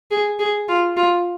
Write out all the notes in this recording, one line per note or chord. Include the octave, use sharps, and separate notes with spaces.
G#4
G#4
F4
F4